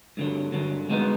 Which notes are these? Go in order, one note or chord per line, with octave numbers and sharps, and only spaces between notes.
G2 D3 F#3
G2 D3 F#3
B2 G#3 B3 D#4